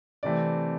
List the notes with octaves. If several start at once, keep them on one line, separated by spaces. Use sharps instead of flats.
C3 E3 A3 C4 D5